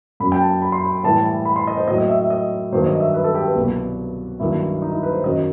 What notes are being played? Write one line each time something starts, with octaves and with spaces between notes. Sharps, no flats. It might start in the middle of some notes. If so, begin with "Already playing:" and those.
F#2 F#3 B5
G5
A5
B5
C6
B5
A2 E3 G3 A5
B5
C6
D#5
C5
A2 F#3 D#5
D#5
E5
E5
D#5
G2 D#3 F#3 C5
D#5
E5
B4
A4
G4
B4
C2 B2 F#3
G2 D#3 F#3 E4
D#4
E4
B4
C5
F#2 D#3 F#3 D#5